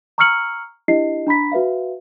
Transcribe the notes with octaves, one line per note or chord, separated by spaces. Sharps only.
A#5 C#6 E6 F6 C#7 F#7
D4 E4 G4 D#5 C7
D4 A#5 B5 B6
F#4 B4 E5 F5